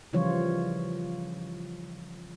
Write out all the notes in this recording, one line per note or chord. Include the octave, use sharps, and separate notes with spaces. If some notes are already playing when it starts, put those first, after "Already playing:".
C#3 E3 F3 G3 F4 C#5